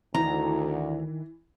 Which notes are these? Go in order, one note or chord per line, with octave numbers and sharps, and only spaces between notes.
D2 D#3 E3 A#5